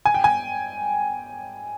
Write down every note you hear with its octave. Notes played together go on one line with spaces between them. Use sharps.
G#5
G5
G#5